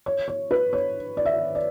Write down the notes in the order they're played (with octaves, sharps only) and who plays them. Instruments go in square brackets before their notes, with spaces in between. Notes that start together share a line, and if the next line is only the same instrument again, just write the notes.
[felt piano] C#5
C#5
B4
C#5
D5
E5
D5